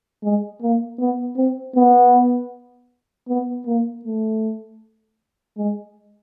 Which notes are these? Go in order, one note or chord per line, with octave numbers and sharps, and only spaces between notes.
G#3
A#3
B3
C4
B3
B3
A#3
A3
G#3